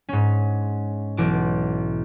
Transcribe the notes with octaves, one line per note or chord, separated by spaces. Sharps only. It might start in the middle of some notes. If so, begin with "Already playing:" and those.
G#2 C#4
B1 E3 D6